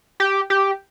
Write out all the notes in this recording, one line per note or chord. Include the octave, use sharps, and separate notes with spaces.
G4
G4